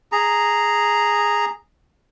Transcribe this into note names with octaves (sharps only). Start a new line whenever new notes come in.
G#4 A#5